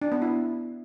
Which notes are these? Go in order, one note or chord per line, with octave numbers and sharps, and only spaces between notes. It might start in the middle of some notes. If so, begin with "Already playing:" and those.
D4
B3
E4